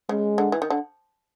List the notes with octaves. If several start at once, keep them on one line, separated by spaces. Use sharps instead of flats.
C#3 G#3
D3
E3
D#3
D3